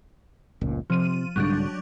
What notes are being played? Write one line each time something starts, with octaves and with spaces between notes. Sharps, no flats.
F1 C#2 A#2
C3 F3 D#7
C2 G#2 D3 F#3 G3 D4